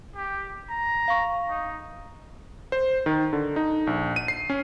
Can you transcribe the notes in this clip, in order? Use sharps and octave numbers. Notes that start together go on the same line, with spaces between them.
G4
A#5
F5 C#6
D#4
C5
D#3
D3
D#4
A#1
D#7
C7
C#4